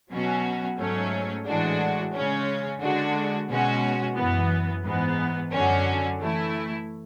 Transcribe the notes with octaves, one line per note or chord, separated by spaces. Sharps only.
B2 F#3 C#4 F#4
G#2 F#3 A3 C#4
A2 E3 G#3 D4 F#4
C#3 G#3 C#4
D3 G#3 D4 F#4
B2 G#3 C#4 F#4
F#2 E3 B3
G#2 E3 B3
F#2 D3 F#3 C#4 F#4
E3 A3 E4